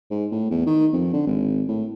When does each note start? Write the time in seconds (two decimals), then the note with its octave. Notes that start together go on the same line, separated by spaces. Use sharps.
0.11 G#2
0.32 A2
0.51 E2
0.66 D#3
0.93 F2
1.13 D3
1.27 G#1
1.68 A2